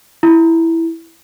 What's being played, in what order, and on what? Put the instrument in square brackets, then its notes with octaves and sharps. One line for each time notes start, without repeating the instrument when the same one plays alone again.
[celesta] E4